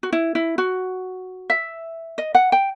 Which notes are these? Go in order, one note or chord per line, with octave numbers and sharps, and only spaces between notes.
F#4
E4
E4
F#4
E5
D#5
F#5
G5